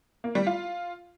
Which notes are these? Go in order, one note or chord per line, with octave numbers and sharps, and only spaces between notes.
A#3
G3
F4